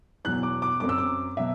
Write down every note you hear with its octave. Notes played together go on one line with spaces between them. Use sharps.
E2 B2 F#3 F#6
D6
D6
F#2 F#3 C4 D6
E6
D6
B2 F#3 E5